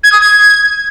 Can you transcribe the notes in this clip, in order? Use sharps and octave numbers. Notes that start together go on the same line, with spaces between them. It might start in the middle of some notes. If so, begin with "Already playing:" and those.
G#6
D#6
G#6